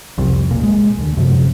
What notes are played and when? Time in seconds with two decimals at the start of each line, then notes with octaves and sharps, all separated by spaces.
0.18 C2 F2
0.51 D#1 B1 A#2
0.63 G#3
0.97 D#2 D3
1.16 F#1 F#2 C3 F3